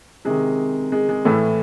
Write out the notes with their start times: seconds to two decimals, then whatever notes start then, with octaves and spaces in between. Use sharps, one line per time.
0.25 C3 D#3 G#3
0.92 G#3
1.09 G#3
1.25 A2 E3 A3